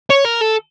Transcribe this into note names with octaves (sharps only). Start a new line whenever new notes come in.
C#5
A#4
A4